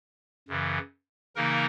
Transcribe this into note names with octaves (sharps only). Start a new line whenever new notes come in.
F#2 C#3 E3
C#3 E3 A#3 D#4 A#4